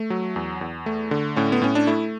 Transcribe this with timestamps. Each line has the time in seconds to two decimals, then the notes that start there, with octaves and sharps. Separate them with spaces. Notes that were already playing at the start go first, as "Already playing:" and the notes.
Already playing: A3
0.10 F#3
0.36 E2
0.61 E2
0.86 A3
1.11 D3
1.36 A2 C#4
1.52 B3
1.62 A2 C#4
1.75 D4
1.87 A3 E4